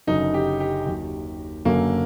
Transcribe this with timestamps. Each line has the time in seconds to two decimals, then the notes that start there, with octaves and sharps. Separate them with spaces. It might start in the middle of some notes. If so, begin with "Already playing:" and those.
0.07 F#1 F#2 D3 F#3 D#4
0.34 G4
0.60 G4
0.86 D#2 D#3 F#3
1.65 F#1 F#2 D3 F#3 A#3